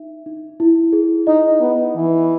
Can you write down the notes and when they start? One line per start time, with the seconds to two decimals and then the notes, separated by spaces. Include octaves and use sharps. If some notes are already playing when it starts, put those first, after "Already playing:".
Already playing: D#4 E5
0.26 D#4
0.60 E4
0.93 G#4
1.27 D#4 D#5
1.60 B3 F#5
1.95 E3 D#5